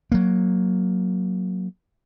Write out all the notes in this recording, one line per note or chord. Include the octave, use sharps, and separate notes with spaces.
F#3 A#3